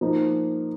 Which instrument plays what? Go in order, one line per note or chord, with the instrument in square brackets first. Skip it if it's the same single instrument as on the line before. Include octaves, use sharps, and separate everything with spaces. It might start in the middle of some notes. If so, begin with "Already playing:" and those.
[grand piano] F3 A#3 D#4